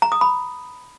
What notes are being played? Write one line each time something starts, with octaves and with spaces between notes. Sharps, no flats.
A#5
D#6
B5